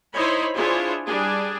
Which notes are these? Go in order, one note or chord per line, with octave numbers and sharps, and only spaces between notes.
D#4 E4 C5 C#5 D#5 B5
D4 E4 F4 G#4 C5 C#5
G3 D4 G#4